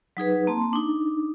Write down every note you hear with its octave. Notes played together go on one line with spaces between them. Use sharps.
F#3 D#4 G#4 B4
A#3 C4 A5 C6
D4 D#4